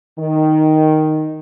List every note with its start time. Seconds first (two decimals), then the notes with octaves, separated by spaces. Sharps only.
0.19 D#3